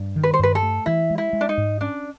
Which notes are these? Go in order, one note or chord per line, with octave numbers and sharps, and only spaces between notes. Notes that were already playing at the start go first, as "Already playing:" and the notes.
Already playing: G2
D#3
B4
C5
G2 B4
A4
A3
E3 E4
G#3
E4
G#3
D4
D#4
G#2
C#4 D4